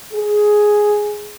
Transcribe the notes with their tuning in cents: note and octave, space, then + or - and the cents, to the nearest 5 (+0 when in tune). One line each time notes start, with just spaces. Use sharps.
G#4 +5